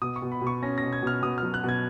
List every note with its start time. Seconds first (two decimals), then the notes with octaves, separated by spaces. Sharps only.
0.02 B2 D#6
0.16 C#6
0.22 B2
0.32 B5
0.42 B2
0.47 C#6
0.63 C#4 A#6
0.78 A#6
0.83 B2
0.93 G#6
1.03 B2 F6
1.22 B2 D#6
1.38 F#3 F6
1.54 F#6
1.64 B2 G#6